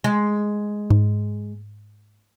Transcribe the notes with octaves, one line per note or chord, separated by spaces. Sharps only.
G#3
G#2